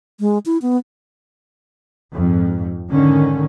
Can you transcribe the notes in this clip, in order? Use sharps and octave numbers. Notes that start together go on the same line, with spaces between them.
G#3
E4
B3
F2 G#2
G#2 D3 D#3 C#4